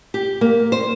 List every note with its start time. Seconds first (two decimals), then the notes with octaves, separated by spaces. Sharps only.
0.14 G4
0.41 A#3
0.72 C5